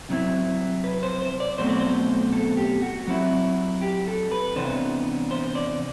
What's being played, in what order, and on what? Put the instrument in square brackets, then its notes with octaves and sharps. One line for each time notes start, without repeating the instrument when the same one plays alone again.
[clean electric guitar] C3 F#3 C4 E4
B4
C5
C5
D5
B2 F#3 A3 C4 C5
D5
C5
A4
G4
F#4
F#3 C4 E4
G4
A4
B4
C3 E3 B3 D4 C5
C5
D5